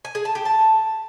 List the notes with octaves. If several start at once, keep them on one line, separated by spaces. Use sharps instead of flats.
G#5
G#4
A5
G4
A5